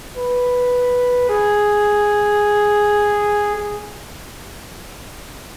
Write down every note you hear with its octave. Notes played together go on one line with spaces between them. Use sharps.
B4
G#4
G#4